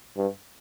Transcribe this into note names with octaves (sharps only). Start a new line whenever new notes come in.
G2